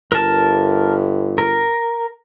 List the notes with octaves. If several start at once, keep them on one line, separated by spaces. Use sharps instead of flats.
G1 A#4 A5
A#4